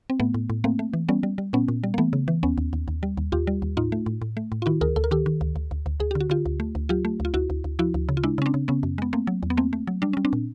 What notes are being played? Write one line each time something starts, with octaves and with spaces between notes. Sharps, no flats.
C4
A2 A3 B3
A2
A2
A3 A#3 C4
A3
E3
G3 B3 C#4
G3
G3
A#2 B3 C#4
A#2
G3
A#3
E3 A3 B3
C#3
E3
D#2 B3 C#4
D#2
D#2
D#2
G3
D#2
D#2 F4 G4
G3
D#2
A2 D#4 F4
A3
A2
A2
A3
A2
F4
D#3 E4 F#4
D2 G#4 A#4
D2 A4
A#4
D#3 G4 A4
D#3
D2
D2
D2
D2
D2 G#4
D3 G4
F#4
D3 F4 G4
D2
A3
D2
F#3 F4 G4
A3
D2
F4
D2 E4 F#4
D2
D2
F3 E4 F#4
D2
C#3
F4
G#3 D4 E4
C#3 C#4
C4 D4
C#3
C#3 B3 C#4
F#2
G#3 B3
A3 A#3 C4
F#3
E2
B3
A3 A#3 C4
A3
F#3
G3 D4
G3 C#4
C4 D4
A#2